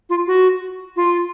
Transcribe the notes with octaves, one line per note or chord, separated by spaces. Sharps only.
F4
F#4
F4